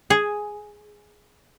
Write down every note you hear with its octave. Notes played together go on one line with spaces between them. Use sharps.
G#4